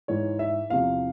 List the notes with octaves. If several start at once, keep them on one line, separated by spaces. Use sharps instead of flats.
G#2 E3 C#5
E5
E2 C3 F3 F5